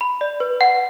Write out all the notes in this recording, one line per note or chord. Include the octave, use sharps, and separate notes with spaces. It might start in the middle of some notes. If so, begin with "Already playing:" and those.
B5
D5
B4
F#5